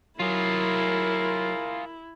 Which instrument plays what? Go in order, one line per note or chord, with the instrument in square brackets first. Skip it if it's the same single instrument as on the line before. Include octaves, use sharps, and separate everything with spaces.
[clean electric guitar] F#3 [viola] E4 [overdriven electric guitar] F4 G#4 [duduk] A#4